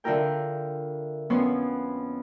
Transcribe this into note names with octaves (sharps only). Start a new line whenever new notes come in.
D3 E4 F4 A#4 G5
F2 B3 C#4 C#5 C6